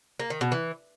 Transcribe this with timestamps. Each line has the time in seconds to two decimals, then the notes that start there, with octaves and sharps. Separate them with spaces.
0.20 A#3
0.30 D#3
0.41 B2
0.52 E3